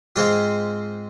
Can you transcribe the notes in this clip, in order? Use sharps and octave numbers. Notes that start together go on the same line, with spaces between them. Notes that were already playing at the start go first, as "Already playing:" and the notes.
G#2 G#3 C4 F4 F5